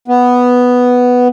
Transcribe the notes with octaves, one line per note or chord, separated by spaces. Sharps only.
B3